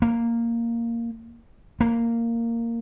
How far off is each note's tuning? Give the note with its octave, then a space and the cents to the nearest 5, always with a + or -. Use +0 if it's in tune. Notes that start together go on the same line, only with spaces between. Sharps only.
A#3 -5
A#3 -10